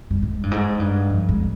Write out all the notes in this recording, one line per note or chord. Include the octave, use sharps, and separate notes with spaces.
G2
G#2
G2
G#2
G2
F2
G#2